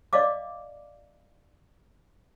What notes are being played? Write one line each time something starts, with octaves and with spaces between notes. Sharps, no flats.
D5 D#5 F5 D6